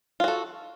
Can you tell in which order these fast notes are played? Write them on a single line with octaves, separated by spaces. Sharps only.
F4 F#4 A4